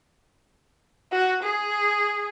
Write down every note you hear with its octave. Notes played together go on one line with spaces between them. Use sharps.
F#4
G#4